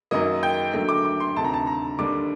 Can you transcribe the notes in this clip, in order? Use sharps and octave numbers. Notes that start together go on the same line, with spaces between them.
F#2 D#3 F#3 A#3 D#5
G5
D#2 D3 F#3 A3 G5
D6
D6
C6
D2 C3 D#3 A5
A#5
A5
A#5
D#2 D3 G3 D4 D6